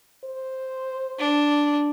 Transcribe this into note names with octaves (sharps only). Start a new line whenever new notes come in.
C5
D4